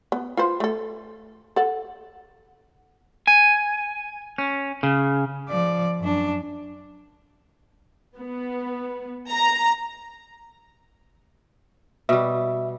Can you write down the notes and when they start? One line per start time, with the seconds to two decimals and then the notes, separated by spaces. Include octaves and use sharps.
0.12 B3
0.37 F4 B4 C5
0.60 A3 A4
1.56 A4 F#5
3.27 G#5
4.38 C#4
4.83 C#3
5.48 F3 D5
6.00 F#2 D4
8.18 B3
9.31 A#5
12.09 B2 G3 E5